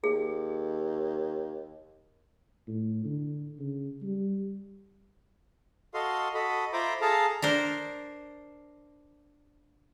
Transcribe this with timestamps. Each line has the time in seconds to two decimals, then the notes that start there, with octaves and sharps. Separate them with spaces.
0.04 D#2 G#4
2.68 A2
3.05 D3
3.59 C#3
4.03 G3
5.94 F#4 A4 D#5 F5 C6
6.34 F#4 A4 D#5 B5
6.73 F4 C5 E5 A#5 B5 D6
7.01 G#4 A4 F5 A5 A#5
7.42 D4 A#4 C5